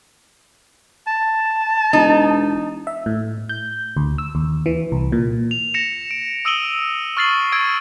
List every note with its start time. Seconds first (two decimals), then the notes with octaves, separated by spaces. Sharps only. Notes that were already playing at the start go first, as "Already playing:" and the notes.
1.07 A5
1.93 E1 D#4
2.87 E5
3.06 A2
3.49 G6
3.97 D2
4.18 E6
4.35 D#2
4.66 E3
4.92 C2
5.12 A#2
5.51 F7
5.74 A#6 C#7 E7
6.11 D7
6.45 D#6 E6 D7 D#7 F#7 G7
7.17 C#6 F6 A6 C7 F#7
7.52 C#6 E6 G#6 D7